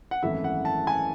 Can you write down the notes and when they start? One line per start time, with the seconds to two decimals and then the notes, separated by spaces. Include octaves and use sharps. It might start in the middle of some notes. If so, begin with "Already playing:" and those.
0.11 F#5
0.22 G#1 F#2 E3 A3 E4 E5
0.44 F#5
0.65 A5
0.87 G#5